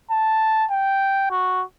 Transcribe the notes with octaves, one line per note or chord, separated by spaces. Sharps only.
A5
G5
F#4